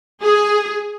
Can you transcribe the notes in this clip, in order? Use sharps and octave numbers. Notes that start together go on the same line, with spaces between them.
G#4